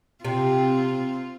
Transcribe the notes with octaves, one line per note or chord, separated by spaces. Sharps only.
C3 C4 F4